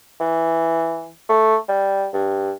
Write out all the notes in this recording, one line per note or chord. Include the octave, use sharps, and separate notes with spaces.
E3
A3
G3
G2